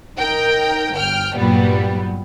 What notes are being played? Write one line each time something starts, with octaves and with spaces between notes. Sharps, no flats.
D#4 A#4 G5
G1 G5 F6
G2 A#2 F#3 G3 B3